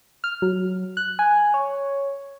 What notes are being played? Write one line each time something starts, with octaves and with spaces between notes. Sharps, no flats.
F6
F#3
F#6
G#5
C#5